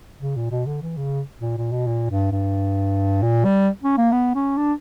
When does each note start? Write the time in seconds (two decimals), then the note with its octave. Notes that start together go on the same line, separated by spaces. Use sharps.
0.21 C#3
0.36 A#2
0.51 B2
0.67 D3
0.82 E3
0.97 C#3
1.41 A#2
1.57 A#2
1.71 B2
1.87 A#2
2.10 G2
2.32 G2
3.22 A#2
3.45 G3
3.83 C#4
3.97 A#3
4.12 B3
4.35 C#4
4.57 D4